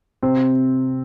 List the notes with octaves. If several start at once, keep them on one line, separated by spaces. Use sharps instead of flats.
C3 C4